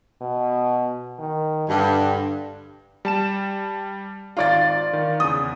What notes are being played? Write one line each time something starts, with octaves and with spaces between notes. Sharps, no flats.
B2
D#3
G2 D3
G3 A5 E7
G#1 D#4 F4 D5 A6
D#3
E2 C#3 D#6